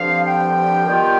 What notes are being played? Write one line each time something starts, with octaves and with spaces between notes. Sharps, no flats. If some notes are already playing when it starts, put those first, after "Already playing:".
Already playing: G2 D3 F3 C4 F5
G5
D#3 G3 B3 F4